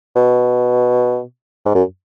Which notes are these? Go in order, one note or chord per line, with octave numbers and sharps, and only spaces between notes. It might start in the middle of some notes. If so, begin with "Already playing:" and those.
B2
G#2
F#2